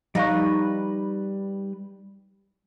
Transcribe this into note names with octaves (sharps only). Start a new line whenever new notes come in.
F3 G3 D#4 B4 F5 C#6 F#6